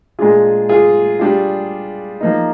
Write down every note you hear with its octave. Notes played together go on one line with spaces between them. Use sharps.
A#2 G#3 D4 F4 G#4
F4 G#4
G3 D4 F4
F3 A#3 D#4